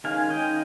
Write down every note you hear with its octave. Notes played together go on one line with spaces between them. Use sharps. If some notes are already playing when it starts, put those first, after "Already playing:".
D#3 G#3 C#4 F5 G#5
D#5 G5